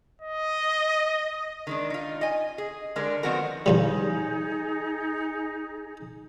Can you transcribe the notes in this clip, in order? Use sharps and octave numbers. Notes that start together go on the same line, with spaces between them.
D#5
D#3 G#3 D4
D#4 F4
D#5 G#5
G#4
D3 G3 G#3 D4 A#4
D#3 F3 B3 C4 F#4 A#4
E2 C#3 G3 D#4 G#4